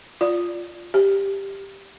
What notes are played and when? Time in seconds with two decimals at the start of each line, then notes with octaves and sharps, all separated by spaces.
0.21 F4 D5
0.94 G4